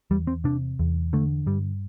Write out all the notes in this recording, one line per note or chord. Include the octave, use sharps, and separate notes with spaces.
E2 G3
C4
C3 D4
E2
D3 A3
G2 G3